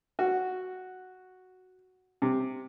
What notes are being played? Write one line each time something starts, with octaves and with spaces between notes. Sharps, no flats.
F#4
C3